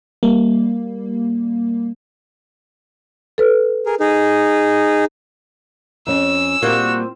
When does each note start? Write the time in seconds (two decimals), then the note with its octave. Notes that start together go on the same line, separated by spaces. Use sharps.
0.23 G3 A#3
3.38 A4 B4
3.86 G#4 A#4
4.00 D#4 G#4
6.07 F2 C#4 E6
6.62 A#2 G3 A#3 C4 F4 F#4